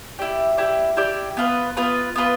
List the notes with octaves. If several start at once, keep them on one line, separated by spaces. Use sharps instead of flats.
E4 G4 D5
E4 G4 D5
E4 G4 D5
B3 F4 B4
B3 F4 B4
B3 F4 B4